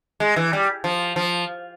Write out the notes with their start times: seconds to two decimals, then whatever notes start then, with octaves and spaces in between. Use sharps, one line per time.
0.20 G#3
0.36 E3
0.53 G3
0.84 F3
1.16 F3